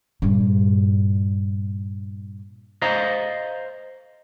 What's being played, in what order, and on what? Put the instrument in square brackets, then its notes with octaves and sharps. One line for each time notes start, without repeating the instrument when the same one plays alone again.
[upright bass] G2 A#2
[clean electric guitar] C5 D#5 F5 A#5